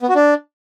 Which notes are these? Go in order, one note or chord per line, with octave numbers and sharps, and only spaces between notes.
B3
F#4
D4